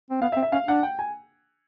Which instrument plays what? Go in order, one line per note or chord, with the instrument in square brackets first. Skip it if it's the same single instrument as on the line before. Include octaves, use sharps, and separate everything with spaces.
[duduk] C4
[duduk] B3 [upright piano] F5
[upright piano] E5
[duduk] C4
[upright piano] E5
[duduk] C#4 [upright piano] F5
[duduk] D4 [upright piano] F#5
[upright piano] G5
G#5